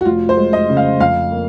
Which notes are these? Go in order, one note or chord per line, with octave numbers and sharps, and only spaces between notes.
F#4
F1 F4
C5
G#3
D#5
C#3
F5
F2 F5
A#3